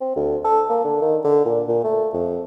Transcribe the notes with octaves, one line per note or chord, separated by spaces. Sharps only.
C4
D2
A4
A#3
D3
D#3
D3
A#2
A#2
A3
F2